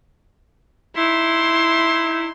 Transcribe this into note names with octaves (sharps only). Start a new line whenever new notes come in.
D#4 E4 C6